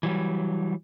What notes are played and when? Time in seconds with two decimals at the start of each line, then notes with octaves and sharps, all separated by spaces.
0.03 E3 F#3 G3